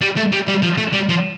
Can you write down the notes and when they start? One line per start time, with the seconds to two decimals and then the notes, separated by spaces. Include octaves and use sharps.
0.01 G3
0.17 A3
0.32 G3
0.48 G3
0.63 F3
0.78 A3
0.94 G3
1.10 F3